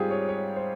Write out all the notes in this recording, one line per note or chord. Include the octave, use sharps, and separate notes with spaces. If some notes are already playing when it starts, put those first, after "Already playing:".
Already playing: G#2 G3 C4 F4 G4 G#4
C#5
C#5
C5